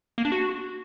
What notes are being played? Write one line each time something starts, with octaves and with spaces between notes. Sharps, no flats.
A#3
D4
F#4